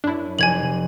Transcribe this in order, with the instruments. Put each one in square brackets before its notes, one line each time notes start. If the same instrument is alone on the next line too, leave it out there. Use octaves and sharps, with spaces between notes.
[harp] F#2 [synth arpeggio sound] D4 E4
[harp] F1 G4 C5 [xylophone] G#5 G#6 F#7
[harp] C3